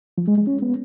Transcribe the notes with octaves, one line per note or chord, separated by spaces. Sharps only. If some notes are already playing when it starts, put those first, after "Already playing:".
F3
G#3
G#3
C#4
B3